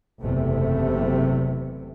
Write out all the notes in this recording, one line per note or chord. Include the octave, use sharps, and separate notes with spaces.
F#1 E2 C3 A3